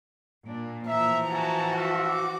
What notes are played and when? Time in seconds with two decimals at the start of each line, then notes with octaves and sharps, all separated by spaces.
0.47 A#2 D4
0.87 E3 F3 E5 A#5
1.29 F#4 E5 G#5 A5
1.75 F4 E5 A5
2.07 D6